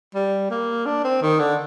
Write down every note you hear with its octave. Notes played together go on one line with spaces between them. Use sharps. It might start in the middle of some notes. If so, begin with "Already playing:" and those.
G3
A#3
D4
C4
D#3
D3